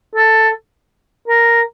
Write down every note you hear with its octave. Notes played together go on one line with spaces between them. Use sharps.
A4
A#4